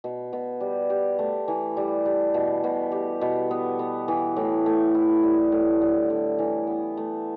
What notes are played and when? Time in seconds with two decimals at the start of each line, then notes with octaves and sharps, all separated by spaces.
0.04 B2
0.33 B2
0.61 G3
0.90 G4
1.19 A3
1.48 E3
1.77 G3
2.06 G3
2.34 B2
2.64 B2
2.92 G4
3.21 B2
3.51 B3
3.79 B3
4.08 E3
4.36 A2
4.66 A3
4.95 E4
5.24 G3
5.52 A2
5.82 D3
6.10 D3
6.39 E3
6.67 B3
6.97 A3